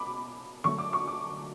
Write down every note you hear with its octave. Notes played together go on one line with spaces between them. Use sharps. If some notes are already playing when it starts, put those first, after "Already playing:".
Already playing: B2 B5 D6
D3 F#3 A3 C#6
D6
C#6
D6